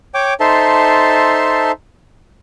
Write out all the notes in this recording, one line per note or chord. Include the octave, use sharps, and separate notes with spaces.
C#5 G5 D6
D#4 A4 C5 E5 A5 C6